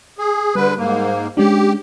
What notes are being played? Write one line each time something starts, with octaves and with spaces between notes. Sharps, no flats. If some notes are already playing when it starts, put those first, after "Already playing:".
G#4
D3 G3 B4
G#2 A#3
G#3 C#4 D4 G4